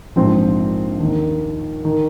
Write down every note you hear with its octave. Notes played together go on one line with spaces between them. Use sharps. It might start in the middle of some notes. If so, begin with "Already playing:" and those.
A#1 G#2 F3 C4
D#2 D#3
D#3